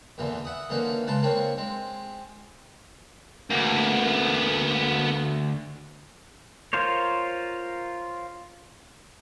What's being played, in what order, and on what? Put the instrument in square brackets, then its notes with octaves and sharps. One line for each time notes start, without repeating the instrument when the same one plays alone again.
[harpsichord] E2 A#2 D3 E3
E5 F#5 B5 D#6
D3 E3 A#3 C#4 D#4 F#4
C#3 G#3 B4 A5 C6
A#3 C4 D4 C#5 B5 C#6
G#3 C4
[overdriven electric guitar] D2 [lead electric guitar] A#3 B3
[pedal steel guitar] F4 A#4 C5 C#5